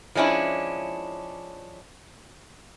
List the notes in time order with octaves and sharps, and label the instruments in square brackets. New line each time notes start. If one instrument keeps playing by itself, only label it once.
[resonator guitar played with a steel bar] F3 G#3 C#4 D4 E4